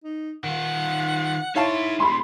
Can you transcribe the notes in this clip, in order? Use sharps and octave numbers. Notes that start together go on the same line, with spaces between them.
D#4
D#3 F4 F#5
D#4 E4 C#5 F5 A5 C6
B2 G#3 B5 C6